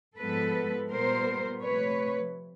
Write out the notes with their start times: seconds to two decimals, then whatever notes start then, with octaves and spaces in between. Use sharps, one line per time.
0.19 G#2 F3 G#3 B3 A4 B4
0.91 A#2 G3 B3 A#4 C5
1.62 C3 F3 A3 B4 C#5